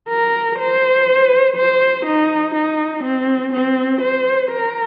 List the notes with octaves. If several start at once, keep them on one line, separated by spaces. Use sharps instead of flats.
A#4
C5
C5
D#4
D#4
C4
C4
C5
A#4